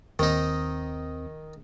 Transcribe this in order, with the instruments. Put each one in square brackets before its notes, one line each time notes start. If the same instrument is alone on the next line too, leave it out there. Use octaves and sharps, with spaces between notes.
[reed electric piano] D#2 C4 [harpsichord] D#3 D#4